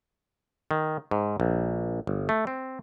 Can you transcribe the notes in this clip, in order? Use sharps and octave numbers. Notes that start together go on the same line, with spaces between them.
D#3
G#2
A#1
G1
A3
C4